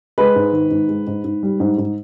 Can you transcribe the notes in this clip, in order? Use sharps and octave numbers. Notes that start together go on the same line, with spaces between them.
G#3 B4
G#2
D#3
G#2
G#3
G#2
G#2
G3
G#2
G#2